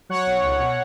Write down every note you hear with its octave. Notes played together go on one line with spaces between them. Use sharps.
F#3 C#5 F#5
B1
C#2
B2